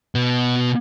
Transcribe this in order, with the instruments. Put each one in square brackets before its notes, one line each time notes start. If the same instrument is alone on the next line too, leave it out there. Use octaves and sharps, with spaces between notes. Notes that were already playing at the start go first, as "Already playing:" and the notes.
[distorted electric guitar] B2 B3